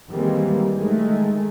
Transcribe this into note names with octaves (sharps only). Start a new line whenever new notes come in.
D#3 E3 G3 G#3 A#3 C4
D#3 G#3 A3